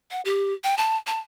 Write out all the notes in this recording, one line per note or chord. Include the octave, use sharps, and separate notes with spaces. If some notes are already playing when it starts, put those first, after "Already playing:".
F#5
G4
G5
A5
A5